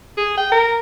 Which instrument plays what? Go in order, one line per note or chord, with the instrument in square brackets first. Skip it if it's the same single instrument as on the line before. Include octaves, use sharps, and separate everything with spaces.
[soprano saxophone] G#4
G5
A#4